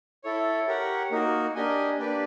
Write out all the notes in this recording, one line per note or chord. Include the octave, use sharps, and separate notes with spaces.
E4 A4 C#5
G4 A#4 C#5 F#5
A#3 D#4 F#4 A#4
D4 G4 A#4 D#5 G#5
A#3 D4 G4 B4 D5